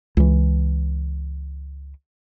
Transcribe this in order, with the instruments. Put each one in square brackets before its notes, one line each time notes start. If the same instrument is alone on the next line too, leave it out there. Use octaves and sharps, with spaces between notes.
[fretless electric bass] C#2 E3